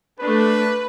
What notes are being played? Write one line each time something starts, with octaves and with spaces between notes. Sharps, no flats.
A3 D4 B4